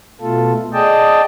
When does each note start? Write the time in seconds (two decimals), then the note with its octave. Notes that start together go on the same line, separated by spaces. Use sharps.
0.21 B2 A3 F4 A4
0.73 G#4 D5 D#5 G5 A5